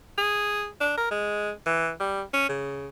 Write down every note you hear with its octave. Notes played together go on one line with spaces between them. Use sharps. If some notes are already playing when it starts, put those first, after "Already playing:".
G#4
D4
A#4
G#3
E3
G3
C#4
C#3